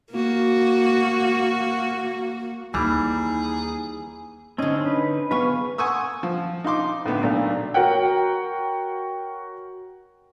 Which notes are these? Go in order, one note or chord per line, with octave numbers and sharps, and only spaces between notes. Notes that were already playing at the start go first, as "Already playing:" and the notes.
A#3 F#4
D#2 E3 G3 D#4 G#4
D3 C4 C#4 D#4 D#5
B4
B3 G#4 B4 F5 C#6
F#5 G#5 C6 C#6 D#6 E6
F3
D#4 F4 C6 D6
A2 D3 B3
B1 A#2 A3 D4 F5
F#4 A#4 C#5 F#5 G5